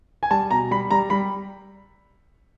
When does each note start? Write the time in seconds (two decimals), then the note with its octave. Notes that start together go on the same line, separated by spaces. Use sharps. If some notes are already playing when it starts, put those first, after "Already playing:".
0.23 G#5
0.31 G3 A5
0.51 B2 A#5
0.71 G3 B5
0.91 G3 A#5
1.10 G3 B5